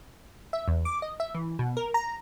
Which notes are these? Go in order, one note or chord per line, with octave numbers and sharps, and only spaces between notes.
E5
E2
D6
D#5
E5
E3
B2
A#4
A#5